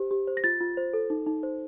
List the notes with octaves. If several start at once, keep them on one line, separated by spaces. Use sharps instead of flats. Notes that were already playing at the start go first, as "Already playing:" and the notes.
Already playing: G4 C5
G4
C5
A#6
F4 A6
F4
C5
A4
D#4
D#4
C5